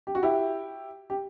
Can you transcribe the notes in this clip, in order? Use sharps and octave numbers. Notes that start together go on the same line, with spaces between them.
G4
F#4
E4 G4
G4